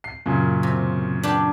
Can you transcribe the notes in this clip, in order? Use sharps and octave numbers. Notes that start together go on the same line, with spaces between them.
C7
F#2 A#2 C#3
C3
D4 G4 B4